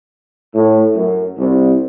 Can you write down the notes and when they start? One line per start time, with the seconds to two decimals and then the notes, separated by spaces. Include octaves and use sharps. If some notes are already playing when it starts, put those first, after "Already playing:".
0.54 A2
0.96 F#2
1.38 C2